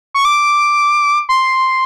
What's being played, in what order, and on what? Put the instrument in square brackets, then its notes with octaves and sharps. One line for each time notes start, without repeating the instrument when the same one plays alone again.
[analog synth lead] C#6
D6
C6